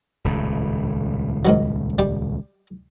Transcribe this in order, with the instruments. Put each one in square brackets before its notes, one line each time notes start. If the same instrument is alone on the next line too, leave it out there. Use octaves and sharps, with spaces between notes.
[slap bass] D#1 C#2 A2
[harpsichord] G#2 D#3 F#3
G3 G4